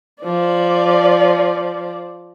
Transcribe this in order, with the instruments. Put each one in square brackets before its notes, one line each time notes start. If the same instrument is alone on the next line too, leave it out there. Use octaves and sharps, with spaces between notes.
[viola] F3 D5